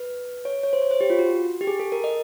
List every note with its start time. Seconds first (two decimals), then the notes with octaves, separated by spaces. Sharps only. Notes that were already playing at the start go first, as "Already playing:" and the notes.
Already playing: B4
0.45 C#5
0.63 C#5
0.73 C5
0.82 C#5
0.91 C5
1.01 G4
1.10 F4
1.19 F#4
1.61 G4
1.67 G#4
1.79 A4
1.92 A#4
2.04 D#5